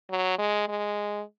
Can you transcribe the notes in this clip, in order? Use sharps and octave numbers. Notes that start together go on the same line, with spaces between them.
F#3
G#3
G#3